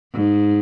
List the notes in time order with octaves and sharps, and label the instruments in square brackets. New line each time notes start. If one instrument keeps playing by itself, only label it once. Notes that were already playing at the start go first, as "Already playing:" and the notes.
[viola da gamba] G#2